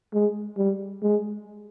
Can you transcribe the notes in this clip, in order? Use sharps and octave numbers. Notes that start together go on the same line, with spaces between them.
G#3
G3
G#3